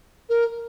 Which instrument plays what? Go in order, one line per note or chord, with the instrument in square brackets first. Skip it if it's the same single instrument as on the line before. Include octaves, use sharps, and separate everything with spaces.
[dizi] A#4